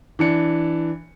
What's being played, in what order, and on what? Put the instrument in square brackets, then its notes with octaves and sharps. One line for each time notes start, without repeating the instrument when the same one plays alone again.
[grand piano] E3 D4 C#7